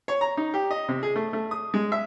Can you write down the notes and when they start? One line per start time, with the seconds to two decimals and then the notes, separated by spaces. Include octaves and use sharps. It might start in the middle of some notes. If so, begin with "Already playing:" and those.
0.08 C#5
0.21 A#5
0.37 D#4
0.54 G4
0.71 D#5
0.88 C3
1.03 G#4
1.16 A3
1.33 A3
1.51 D#6
1.74 G#3
1.92 E5